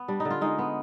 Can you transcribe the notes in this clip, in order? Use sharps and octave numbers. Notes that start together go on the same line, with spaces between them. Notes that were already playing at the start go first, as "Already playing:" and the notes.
Already playing: B3
G3 D4
D#4
D3
F4
G#3 D#4
B3